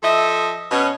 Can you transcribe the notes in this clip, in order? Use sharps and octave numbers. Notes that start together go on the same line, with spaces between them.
F3 A4 D#5 E5
B2 C#4